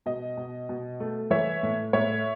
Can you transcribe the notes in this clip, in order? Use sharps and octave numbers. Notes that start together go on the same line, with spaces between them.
B2 D#5
B2
B2
A3
E3 C#5 E5
A2
A2 C#5 E5